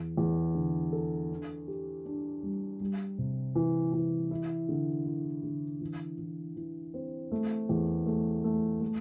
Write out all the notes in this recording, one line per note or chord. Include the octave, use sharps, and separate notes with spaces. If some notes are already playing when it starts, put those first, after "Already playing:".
Already playing: E2
E2
D3
A4
D4
G4
D4
G3
G3
C3
E3
E3
E4
D3
E4
D3
E3
E3
E3
C4
A3
E2
A3
A3
A3